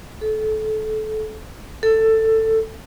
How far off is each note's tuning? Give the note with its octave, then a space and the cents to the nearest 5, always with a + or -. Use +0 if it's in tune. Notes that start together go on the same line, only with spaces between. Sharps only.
A4 -25
A4 +15